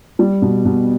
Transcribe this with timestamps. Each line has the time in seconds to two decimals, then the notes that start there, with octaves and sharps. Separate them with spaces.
0.19 G3
0.42 B2
0.65 B2